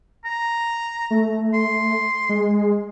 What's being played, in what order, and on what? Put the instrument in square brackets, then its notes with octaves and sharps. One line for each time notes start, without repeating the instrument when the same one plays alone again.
[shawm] A#5
[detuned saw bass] A3
[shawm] C6
[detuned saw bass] G#3